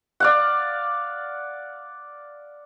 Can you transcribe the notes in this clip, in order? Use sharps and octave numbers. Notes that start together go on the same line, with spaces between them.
D5 F5 F#5